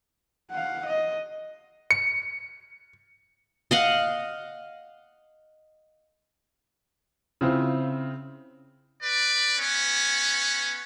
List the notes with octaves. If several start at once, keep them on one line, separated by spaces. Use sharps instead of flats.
F5 F#5
D#5
C#7
D#5 F5 F#5
C#3 C4 E4 F4 C5
B4 D5
B3 C#4